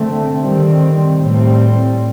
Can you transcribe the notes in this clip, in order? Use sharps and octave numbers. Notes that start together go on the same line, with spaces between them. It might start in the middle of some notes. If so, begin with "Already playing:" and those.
Already playing: D3 A3 C4
D#3 G3 C4
A2 G3 C4